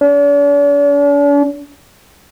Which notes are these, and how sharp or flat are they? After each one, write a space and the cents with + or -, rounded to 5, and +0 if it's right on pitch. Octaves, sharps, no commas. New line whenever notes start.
D4 -45